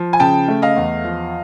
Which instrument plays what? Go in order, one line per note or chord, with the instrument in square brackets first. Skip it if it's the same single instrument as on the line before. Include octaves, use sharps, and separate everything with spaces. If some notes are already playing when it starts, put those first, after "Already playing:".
Already playing: [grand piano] F3
G#5
C#3 G5 A5
A3
D#5 F5
E2
F3